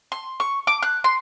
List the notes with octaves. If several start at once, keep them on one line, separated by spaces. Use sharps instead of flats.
C6
C#6
D6
F#6
C6